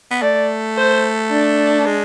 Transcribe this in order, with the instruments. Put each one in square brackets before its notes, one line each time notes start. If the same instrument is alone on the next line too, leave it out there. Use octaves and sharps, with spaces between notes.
[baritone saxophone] B3
[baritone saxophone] A3 [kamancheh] D5
[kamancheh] C5
D4
[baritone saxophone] G#3